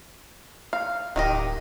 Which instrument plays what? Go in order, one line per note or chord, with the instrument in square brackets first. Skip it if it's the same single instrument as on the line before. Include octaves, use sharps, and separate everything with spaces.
[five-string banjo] F5
[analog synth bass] D1 [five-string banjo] D#3 G4 D#5